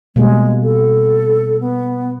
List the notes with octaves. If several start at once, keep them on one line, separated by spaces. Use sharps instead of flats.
B2 G3 G#3 A#3
A4
B3